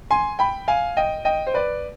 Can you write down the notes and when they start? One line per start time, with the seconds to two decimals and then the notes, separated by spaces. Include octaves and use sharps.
0.11 G#5 C6
0.39 G5 B5
0.68 F5 G#5
0.97 D#5 G5
1.25 D#5 G5
1.47 C5
1.54 B4 D5